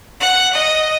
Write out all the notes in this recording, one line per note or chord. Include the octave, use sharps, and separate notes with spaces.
F#5
D#5